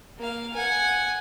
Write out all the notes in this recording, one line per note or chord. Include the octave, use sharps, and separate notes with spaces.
A#3 F5
F#5 G#5